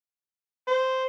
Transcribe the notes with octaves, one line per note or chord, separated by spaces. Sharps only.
C5